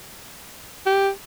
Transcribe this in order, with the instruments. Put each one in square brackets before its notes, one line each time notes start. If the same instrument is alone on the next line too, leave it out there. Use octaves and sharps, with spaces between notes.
[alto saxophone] G4